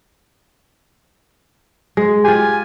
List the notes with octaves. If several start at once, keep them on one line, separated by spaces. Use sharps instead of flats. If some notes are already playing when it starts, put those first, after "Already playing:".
G#3
F4 G4 G#5